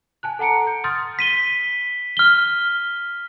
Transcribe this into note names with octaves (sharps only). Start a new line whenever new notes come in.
G#5 A5 F#6
A4 F#5 A#5 C#7 D7
G6 C#7
C6 D#6 F6 G6 A6
B6 D#7 G7
F6 G7